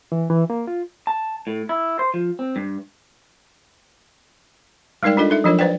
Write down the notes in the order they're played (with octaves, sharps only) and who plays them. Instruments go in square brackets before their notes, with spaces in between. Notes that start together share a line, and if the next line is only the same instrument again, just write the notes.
[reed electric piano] E3
E3
A#3
F4
[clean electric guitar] A5
A2
E4
C5
F3
C4
G2
[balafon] G3 G#3 D#4 A#4 D5 G5
D4 F4 A4 D#5
D#4 A4 E5
F3 F#3 D4 F4 A#4 C#5
B4 C5 D5 G5